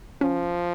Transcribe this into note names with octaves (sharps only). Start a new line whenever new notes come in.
F3 C#4